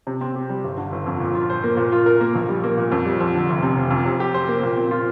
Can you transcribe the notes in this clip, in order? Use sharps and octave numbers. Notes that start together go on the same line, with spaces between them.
C3
C4
G4
G3
G1
D3
G1
F2
A#2
F4
C5
A#3
A#2
F4
A#4
A#3
A#1
G3
A#3
A#2
F2
G3
F2
D3
F1
C3
F1
F2
C3
G4
C5
A#3
A#2
C4
F4